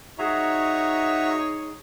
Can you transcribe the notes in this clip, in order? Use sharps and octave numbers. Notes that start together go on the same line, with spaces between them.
D#4 F#4 G#4 C#5 E5 A#5